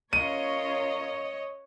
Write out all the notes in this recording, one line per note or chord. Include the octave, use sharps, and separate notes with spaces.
C#4 F4 A#4 C#5 D#5 D#7